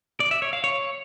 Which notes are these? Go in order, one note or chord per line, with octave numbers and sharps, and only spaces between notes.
D5
E5
C#5
F5
C#5